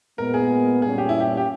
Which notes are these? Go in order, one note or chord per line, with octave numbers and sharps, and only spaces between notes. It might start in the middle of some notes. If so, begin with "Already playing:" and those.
A#2 G#3 B3 A#4
G#4
A#2 G3 C#4 G#4
G4
E4
G4
G4